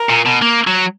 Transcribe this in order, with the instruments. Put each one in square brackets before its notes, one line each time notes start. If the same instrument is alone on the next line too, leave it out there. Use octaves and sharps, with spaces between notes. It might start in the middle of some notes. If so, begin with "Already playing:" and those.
Already playing: [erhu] A#4
[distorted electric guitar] A#2
B2
A#3
F#3